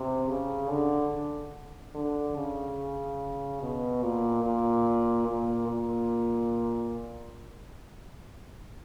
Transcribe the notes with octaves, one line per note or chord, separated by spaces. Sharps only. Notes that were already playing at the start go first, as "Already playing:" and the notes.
Already playing: C3
C#3
D3
D3
C#3
B2
A#2
A#2
A#2
A#2